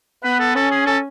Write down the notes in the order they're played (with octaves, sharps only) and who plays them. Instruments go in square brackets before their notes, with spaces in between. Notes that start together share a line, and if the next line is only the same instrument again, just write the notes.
[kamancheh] B3 [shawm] B4
[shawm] A4
[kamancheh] C#4 [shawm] A4
[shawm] G#4
A4